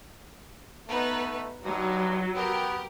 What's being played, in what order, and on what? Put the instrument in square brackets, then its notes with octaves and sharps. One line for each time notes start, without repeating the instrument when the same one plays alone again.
[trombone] A3 [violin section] B3 D#4 B4
[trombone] G2 [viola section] F#3 [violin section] D#4
[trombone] B3 [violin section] G4 A#4